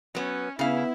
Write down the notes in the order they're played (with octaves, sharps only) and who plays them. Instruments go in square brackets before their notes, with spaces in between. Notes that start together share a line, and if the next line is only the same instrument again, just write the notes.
[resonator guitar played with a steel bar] F#3 B3 [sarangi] C#4
[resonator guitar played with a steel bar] C#3 F5 [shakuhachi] B3 [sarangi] E4